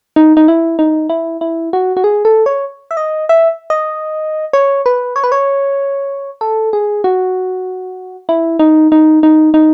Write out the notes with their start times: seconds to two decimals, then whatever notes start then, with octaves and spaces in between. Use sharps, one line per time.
0.16 D#4
0.37 D#4
0.48 E4
0.79 D#4
1.09 E4
1.41 E4
1.73 F#4
1.97 F#4
2.04 G#4
2.25 A4
2.46 C#5
2.91 E5
2.97 D#5
3.29 E5
3.70 D#5
4.53 C#5
4.86 B4
5.16 C#5
5.24 B4
5.32 C#5
6.41 A4
6.73 G#4
7.04 F#4
8.29 E4
8.59 D#4
8.92 D#4
9.23 D#4
9.54 D#4